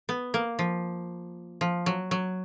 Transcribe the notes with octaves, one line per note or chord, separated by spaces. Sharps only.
B3
A#3
F3
F3
F#3
F#3